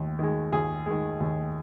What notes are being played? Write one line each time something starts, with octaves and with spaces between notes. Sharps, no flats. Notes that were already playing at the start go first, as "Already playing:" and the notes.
Already playing: D#2
D#3 G#3
D#2 G#4
D#3 G#3
D#2